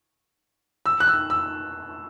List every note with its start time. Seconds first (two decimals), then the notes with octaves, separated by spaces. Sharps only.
0.86 E6
1.00 F#6
1.08 E6
1.30 E6